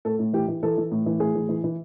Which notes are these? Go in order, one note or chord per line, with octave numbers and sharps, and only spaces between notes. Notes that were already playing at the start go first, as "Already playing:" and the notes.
A2 A4
A2
E3 G4
E3
E3 A4
E3
A2
E3
A2 G#4
E3
E3
E3